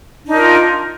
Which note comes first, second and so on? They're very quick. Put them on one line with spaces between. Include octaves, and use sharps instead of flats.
D4 D#4 A#4 F4